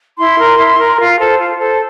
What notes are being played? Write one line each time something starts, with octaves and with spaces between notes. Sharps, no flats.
E4 C6
A#4
E4
A#4
F4
A4 C5
F4
A4 C5